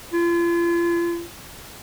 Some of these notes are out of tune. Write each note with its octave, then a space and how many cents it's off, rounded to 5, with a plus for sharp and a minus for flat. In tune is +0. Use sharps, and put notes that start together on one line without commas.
F4 -35